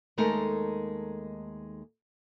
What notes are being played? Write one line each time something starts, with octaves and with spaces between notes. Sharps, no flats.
D#2 G#3 A3 D#4 A4 A#4